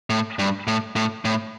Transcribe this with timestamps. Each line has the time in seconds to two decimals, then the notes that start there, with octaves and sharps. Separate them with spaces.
0.10 A2
0.39 G2
0.67 A2
0.96 A2
1.25 A2